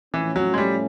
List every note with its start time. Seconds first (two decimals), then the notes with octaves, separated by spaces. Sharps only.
0.14 A2 E3 F3 A3 C#4
0.36 F#3
0.54 G#3
0.58 G3